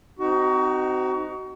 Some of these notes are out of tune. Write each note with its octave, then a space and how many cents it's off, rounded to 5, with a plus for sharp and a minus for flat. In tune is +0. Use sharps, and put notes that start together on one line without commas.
C4 -15 D#4 +0 F#4 +30